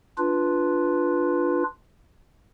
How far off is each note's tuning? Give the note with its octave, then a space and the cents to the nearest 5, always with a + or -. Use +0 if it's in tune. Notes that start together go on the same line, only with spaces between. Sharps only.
D4 +0 F4 +0 B4 -5